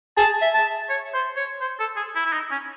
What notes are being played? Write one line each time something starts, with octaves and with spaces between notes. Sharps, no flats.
G#4 A5
E5
A5
C#5
C5
C#5
C5
A4
G#4
E4
E4
D#4
C#4